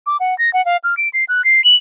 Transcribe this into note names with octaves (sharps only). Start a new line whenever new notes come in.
D6
F#5
A#6
F#5
F5
F6
D7
C7
F#6
C7
F#7